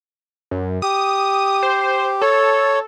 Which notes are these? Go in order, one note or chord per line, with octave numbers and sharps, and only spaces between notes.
F#2
G4 D#6
C5
A4 C#5